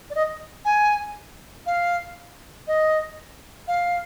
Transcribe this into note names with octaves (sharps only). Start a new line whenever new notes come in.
D5
D#5
G#5
F5
D#5
F5